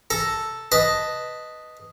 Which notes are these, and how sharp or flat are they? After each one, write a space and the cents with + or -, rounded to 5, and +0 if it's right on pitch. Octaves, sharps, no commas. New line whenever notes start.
A4 +0 A#5 +0
B4 +0 D#5 +0 A5 +0